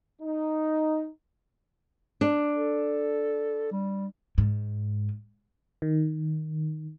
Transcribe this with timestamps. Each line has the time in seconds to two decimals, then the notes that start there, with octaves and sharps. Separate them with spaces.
0.22 D#4
2.21 D4
2.52 A4
3.72 G3
4.38 G#2
5.82 D#3